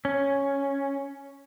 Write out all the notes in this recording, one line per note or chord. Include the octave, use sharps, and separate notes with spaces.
C#4